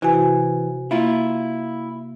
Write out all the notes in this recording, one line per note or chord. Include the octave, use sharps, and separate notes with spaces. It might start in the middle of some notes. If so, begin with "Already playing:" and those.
C3 E3 F#4 G#5
A#3 E4 F4